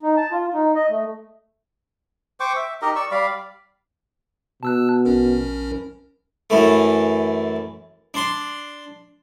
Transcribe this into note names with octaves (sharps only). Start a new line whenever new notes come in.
D#4
A5
F4
D#4
D#5
A3
C5 G5 C#6 D6
E5
D#4 G4 A#4 D#5
D5 C#6 E6
G3 D5 F5 B5
B2 A5 E6 F#6
A#1 C#4 A#4
F#2 E3 A3
D4 C6